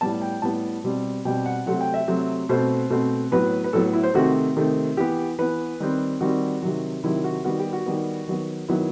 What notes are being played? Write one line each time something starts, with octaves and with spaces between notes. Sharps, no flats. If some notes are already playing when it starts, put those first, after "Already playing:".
A2 G3 B3 A5
G5
A2 G3 B3 A5
B2 G3 C4
B2 G3 C4 G5
F#5
C3 F#3 A3 C4 F#5
G5
E5
C3 F#3 A3 C4
B2 A3 C4 C5
B2 A3 C4
A2 F#3 B3 B4
B4
A2 F#3 B3 A4
E4
C5
C3 D#3 A3 C4 F#4
C3 D#3 A3 C4
E3 B3 G4
E3 B3 B4
D#3 G3 C4
D#3 G3 C4 F#4
C3 D#3 F#3
C3 D#3 F#3 E4
F#4
D#3 G3 B3 F#4
G4
F#4
D#3 G3 B3
D#3 F#3 B3
D#3 F#3 B3 E4